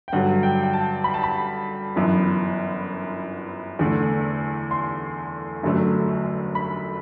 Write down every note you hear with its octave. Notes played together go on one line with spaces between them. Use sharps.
G5
G2 D3 F#3 F#5
G5
G5
A5
B5
A5
B5
G1 F#2 E3 B3
E2 D3 A3
C6
G1 F#2 D3 F#3 A3
B5